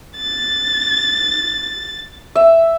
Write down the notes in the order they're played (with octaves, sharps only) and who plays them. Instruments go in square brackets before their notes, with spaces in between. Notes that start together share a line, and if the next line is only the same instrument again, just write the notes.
[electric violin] A6
[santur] E5